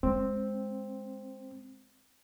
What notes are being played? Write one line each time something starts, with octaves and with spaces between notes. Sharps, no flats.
G#3 C4